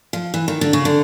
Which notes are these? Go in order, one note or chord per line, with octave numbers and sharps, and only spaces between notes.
F3
E3
D#3
D3
C#3
D3